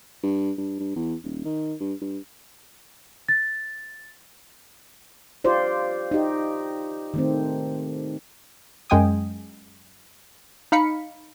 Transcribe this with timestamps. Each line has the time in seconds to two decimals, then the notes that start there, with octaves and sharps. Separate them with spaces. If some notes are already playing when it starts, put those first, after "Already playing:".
0.23 G2
0.58 G2
0.80 G2
0.96 E2
1.24 D#1
1.45 D#3
1.80 G2
2.02 G2
3.29 A6
5.44 F4 G4 C5 D5
6.11 D#4 G4
7.14 D#3 A3 C4
8.90 F#2 G#3 G5 G#5 D#6
10.72 D#4 F5 B5 B6 C#7